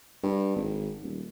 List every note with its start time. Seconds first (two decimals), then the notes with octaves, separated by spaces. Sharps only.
0.23 G2
0.56 G#1
1.02 D#1